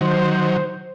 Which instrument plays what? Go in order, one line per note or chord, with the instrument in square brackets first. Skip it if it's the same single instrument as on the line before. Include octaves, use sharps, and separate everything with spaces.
[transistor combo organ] D#3 F#3 [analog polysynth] C5